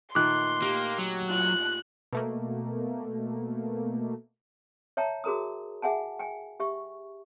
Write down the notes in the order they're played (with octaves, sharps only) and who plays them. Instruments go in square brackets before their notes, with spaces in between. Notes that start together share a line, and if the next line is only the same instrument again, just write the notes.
[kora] A#2 D#3 A3 [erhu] C6 [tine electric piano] D6 F#6
[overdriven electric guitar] A#3 [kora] G4
[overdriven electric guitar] F#3
[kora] E4 F4 [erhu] F#6
[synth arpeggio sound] B2 A3 A#3
[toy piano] C#5 E5 G5 A5 A#5
F#4 G#4 A#4 A#5 D#6
G#4 E5 F#5 G#5 A5
G5 G#5
G4 E5 C#6